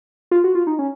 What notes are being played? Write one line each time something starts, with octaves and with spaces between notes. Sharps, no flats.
F4
F#4
F4
D#4
C#4